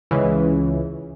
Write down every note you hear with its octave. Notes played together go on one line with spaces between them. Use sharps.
C#2 C#3 E3